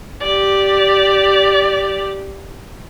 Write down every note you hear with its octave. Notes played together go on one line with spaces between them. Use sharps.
G4 D5